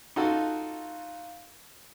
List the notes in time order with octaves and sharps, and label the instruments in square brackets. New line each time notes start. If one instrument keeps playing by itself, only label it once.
[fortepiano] D#4 F4 F#4 A4